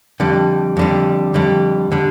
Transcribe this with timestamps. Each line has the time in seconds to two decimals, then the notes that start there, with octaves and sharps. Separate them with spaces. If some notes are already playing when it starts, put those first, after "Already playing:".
0.20 F2 D3 G3
0.77 F2 D3 G3
1.34 F2 D3 G3
1.92 D3 G3